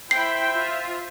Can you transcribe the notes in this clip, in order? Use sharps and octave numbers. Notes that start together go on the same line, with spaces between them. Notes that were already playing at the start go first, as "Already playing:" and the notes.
E4 C5 E5 G5 B5 C7
F4